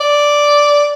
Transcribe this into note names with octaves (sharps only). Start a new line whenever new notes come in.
D5